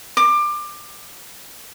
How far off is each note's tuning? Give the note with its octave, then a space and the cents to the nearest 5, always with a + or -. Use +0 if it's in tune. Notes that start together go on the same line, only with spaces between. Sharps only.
D6 +25